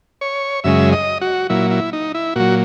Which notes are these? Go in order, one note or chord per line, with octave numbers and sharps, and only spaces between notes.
C#5
F#2 C#3 G#3 E5
D#5
F#4
A#2 F#3 E4
E4
D#4
E4
A#2 F#3 F#4